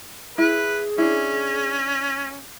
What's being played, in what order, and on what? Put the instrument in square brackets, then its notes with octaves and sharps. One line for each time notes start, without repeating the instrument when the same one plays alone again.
[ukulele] E4 [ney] G#4 [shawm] B4
[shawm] C#4 [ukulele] D4 E4